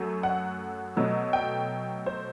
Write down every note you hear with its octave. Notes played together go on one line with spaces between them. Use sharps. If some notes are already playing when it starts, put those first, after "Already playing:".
Already playing: F#2 F#3 A3
F#5
B2 F#3 A3
G5
C5